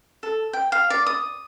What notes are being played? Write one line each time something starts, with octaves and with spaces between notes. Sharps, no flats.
A4
G5
F5
D5
D#6